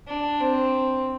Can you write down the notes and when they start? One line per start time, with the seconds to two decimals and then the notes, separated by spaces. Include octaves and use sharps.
0.08 D4
0.41 C4